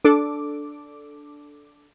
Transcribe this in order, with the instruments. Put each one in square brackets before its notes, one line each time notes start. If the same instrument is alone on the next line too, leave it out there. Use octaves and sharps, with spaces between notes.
[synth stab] D4 A4 D6